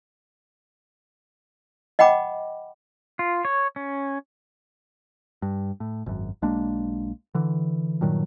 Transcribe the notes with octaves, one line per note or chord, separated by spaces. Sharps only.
D#5 F#5 G5 B5 D6
F4
C#5
C#4
G2
A2
G#1 F#2
B1 G#3 A#3 D4
D3 E3
G2 A#2 D#3 F#3